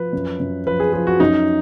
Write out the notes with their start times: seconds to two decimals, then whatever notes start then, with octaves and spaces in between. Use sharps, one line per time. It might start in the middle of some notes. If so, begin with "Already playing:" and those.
Already playing: F3 B4
0.13 F#2
0.40 F#2
0.67 F3 B4
0.80 G#4
0.93 F3 G#4
1.07 F#4
1.20 F#2 D#4